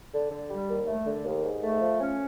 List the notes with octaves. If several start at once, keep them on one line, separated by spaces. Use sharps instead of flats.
D3
D3
G3
D#2
A3
D3
D#2
G#2
A3
F3
C#4